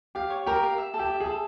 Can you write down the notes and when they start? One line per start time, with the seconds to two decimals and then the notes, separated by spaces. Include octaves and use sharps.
0.15 G4 F5
0.30 C#5
0.46 G4 A#4
0.63 F5
0.78 E5
0.94 A4
0.99 G4
1.10 E5
1.20 G#4
1.26 A4